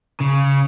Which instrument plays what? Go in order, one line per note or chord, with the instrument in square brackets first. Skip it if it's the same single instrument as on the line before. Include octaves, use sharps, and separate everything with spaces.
[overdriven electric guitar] C#3